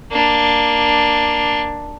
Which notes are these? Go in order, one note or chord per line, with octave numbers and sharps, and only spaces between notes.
A#3 D4